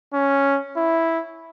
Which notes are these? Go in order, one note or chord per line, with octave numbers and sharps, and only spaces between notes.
C#4
E4